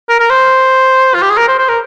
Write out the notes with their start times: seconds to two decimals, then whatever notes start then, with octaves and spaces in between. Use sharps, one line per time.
0.09 A#4
0.20 A#4
0.30 C5
1.14 F4
1.22 G4
1.30 G#4
1.37 A#4
1.48 C5
1.58 C5
1.69 A#4